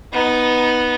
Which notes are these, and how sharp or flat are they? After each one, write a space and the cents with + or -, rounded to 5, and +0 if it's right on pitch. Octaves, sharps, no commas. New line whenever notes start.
B3 +0 D#4 +10